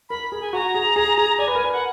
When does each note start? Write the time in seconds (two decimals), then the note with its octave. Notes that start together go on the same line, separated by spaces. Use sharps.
0.09 A#4 B5
0.32 G#4
0.41 G#5
0.53 F#4 A#5
0.74 G#4
0.96 G#4
1.18 G#4
1.39 D5 G#5
1.47 B4
1.55 A#4
1.64 B4
1.72 F#5